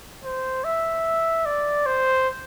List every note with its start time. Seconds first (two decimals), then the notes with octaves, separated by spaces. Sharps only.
0.24 C5
0.64 E5
1.46 D5
1.86 C5